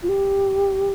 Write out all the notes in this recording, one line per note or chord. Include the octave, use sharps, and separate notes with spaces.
F4
G4